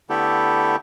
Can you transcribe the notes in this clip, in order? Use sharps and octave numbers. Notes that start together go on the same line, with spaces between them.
D3 A3 B3 E4 G4 A4